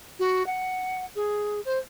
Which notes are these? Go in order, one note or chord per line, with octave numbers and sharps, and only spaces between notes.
F#4
F#5
G#4
C5